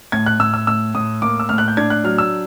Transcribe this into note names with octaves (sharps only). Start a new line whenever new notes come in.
A2 G#6
F#6
A2 E6
E6
A2 E6
A2 D#6
A#3 D6
E6
A2 F6
F#6
G6
D4 G#6
F#6
F#3 F6
E6